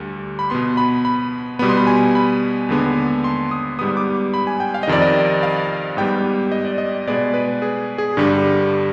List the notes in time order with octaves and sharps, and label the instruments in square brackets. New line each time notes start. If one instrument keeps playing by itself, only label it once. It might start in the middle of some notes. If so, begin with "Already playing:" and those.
Already playing: [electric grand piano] D2 D3 G3
B5
B2 B3 C6
B5
B5
B2 G3 B3 B5
C6
B5
G#5
B5
D#2 D3 G#3 B3
C6
D#6
G#2 G3 B3 D#6
D6
B5
G#5
G5
F5
D#5
F2 C3 D#3 D5
D#5
F5
G#2 G3 B3 G5
D#5
D5
D#5
B2 G#3 B3 D5
B4
G#4
G#4
G2 D3 G3